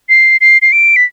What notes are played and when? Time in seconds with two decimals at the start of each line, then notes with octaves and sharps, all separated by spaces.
0.09 C7
0.41 C7
0.62 C7
0.72 D7
0.96 B6